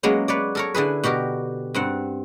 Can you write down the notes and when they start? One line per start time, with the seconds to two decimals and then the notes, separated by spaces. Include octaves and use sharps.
0.03 F#3 G#3 A#3 B3 C#4
0.28 B4 C#5 D5
0.55 A4 A#4 C#5
0.74 D3 E4 G#4 B4
1.03 B2 F#4 G4 A#4
1.74 G2 C4 F#5